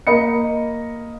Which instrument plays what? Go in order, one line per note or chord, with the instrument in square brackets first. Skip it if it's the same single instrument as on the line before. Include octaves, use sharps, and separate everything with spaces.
[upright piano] A#3 D#5 B5 C#7